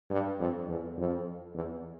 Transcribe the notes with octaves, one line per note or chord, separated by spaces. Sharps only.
G2
F2
E2
F2
E2